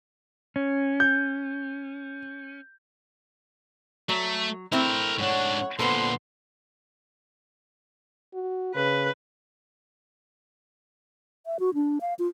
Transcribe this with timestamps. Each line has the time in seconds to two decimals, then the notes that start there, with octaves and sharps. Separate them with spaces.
0.56 C#4
1.00 G6
4.09 F#3 A3
4.72 A3 C4 E4 A#4 C5
5.19 G#2 D4 C#5 F#5
5.79 A#2 D3 B3 A4 B4 C5 C6
8.34 F#4
8.75 C#3 B4
11.46 E5
11.60 F#4
11.74 D4
12.01 F5
12.19 F4